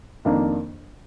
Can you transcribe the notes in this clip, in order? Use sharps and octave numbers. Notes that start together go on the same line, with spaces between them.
F2 D#3 A#3 D4